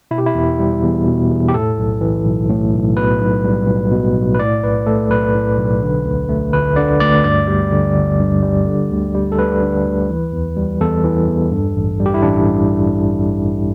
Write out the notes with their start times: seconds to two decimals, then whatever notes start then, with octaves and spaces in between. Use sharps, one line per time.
0.11 B2 E4
0.18 G4
0.26 E4
0.35 E2
0.59 G3
0.83 E2
1.06 B2
1.31 E2
1.48 G4
1.53 A2 A4
1.78 B1
2.01 E3
2.26 B1
2.49 A2
2.73 B1
2.96 B2 B4
3.20 B1
3.44 G3
3.67 B1
3.91 B2
4.15 B1
4.34 B4
4.38 A2 D5
4.62 B1 B4
4.87 A3 A4
5.10 B1 B4
5.34 A2
5.58 B1
5.82 D3
6.05 D2
6.29 A3
6.53 D2 B4
6.76 D3 D5
7.00 D2 D5
7.24 G2 D5
7.47 G3
7.72 D3
7.95 G1
8.19 G2
8.43 G3
8.66 D3
8.91 D2
9.15 G3
9.32 A4
9.38 D2 B4
9.61 D3
9.86 D2
10.10 E3
10.32 E2
10.57 G3
10.81 E2 A4
11.04 E3
11.28 E2
11.51 G2
11.75 A1
11.99 G3
12.06 G4
12.14 E4
12.22 A1 D4
12.46 G2